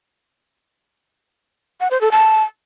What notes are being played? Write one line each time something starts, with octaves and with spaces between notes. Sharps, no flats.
F#5
C5
A4
A5